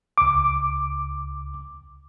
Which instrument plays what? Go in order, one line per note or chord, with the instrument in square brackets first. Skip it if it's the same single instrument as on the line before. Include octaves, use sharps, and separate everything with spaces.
[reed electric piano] C#2 D6